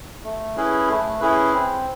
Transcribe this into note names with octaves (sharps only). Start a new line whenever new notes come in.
A3
C#4 E4 G#4 B4
A3
C#4 E4 G#4 B4
C4